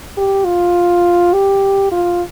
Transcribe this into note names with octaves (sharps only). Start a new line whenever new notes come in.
G4
F4
G4
F4